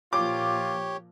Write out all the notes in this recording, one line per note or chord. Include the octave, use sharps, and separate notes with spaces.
A#2 F3 F4 G4 C#5 D6